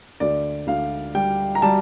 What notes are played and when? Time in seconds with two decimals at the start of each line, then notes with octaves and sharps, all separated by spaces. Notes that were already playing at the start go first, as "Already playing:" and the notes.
0.20 D2 D5
0.67 D2 F5
1.15 G3 G5
1.55 A#5
1.62 G3 A5